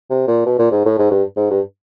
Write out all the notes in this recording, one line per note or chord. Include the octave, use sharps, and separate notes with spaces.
C3
A#2
B2
A#2
G#2
A2
G#2
G2
G#2
G2